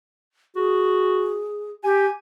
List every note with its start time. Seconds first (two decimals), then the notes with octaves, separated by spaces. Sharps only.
0.56 F#4 G#4
1.84 G4 G#5